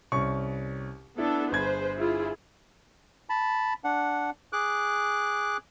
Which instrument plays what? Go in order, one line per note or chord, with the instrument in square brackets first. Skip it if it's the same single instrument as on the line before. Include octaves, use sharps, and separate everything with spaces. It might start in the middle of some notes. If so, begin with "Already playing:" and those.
[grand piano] C2 C#4 C#6
[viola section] B3 D4 A4 [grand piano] E4
[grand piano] G1 G#6 [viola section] G#4 B4 C5
[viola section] E4 F4 G#4
[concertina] A5 B5
D4 F#5
G#4 D6 F#6